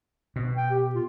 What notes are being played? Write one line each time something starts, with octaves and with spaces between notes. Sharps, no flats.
B2
G5
G4
F4